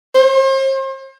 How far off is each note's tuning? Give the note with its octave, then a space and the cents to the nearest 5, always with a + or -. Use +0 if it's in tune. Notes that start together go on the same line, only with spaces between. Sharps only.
C5 +40